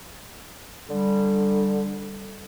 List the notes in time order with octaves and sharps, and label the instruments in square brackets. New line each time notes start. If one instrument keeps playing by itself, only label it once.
[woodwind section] D3 G3